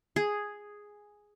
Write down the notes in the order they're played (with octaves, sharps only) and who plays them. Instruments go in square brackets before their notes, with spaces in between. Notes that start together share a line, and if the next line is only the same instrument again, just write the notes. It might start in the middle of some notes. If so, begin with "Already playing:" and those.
[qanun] G#4